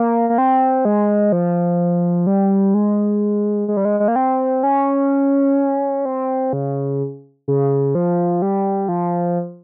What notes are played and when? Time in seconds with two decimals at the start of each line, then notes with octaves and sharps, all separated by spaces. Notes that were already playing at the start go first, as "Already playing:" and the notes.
Already playing: A#3
0.30 A#3
0.38 C4
0.85 G#3
1.32 F3
2.27 G3
2.74 G#3
3.68 G#3
3.77 G3
3.85 G#3
4.00 G#3
4.08 A#3
4.16 C4
4.63 C#4
6.05 C4
6.53 C#3
7.48 C#3
7.95 F3
8.42 G3
8.89 F3